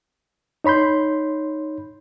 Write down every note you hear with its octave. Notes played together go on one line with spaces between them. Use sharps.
D#4 C#5 B5 C6 G6